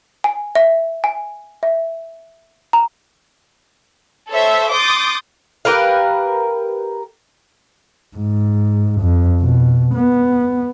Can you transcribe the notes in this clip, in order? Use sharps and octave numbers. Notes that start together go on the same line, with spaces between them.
G#5
E5
G#5
E5
A#5
A4 C5 C#5 E5
C6 D6 D#6 G6 A6
G4 A#4 B4 F5
G#2
F2
B2
B3